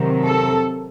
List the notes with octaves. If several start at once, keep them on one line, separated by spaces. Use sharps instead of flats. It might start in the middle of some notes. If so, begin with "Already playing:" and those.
Already playing: C3 D#3 F#3
A4